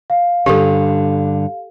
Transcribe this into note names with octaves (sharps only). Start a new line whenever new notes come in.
F5
G2 D3 C#4 G4 A4